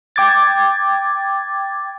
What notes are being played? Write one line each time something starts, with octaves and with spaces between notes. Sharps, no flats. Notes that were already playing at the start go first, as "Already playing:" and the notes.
G5 D6 G#6 A6